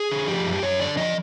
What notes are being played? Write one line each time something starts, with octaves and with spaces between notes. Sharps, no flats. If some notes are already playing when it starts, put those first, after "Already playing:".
Already playing: G#4
D3
F3 G4
F#2
F#2 C#5
D3 D5
F3 D#5